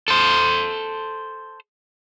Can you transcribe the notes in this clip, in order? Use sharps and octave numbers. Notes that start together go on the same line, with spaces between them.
A4 C5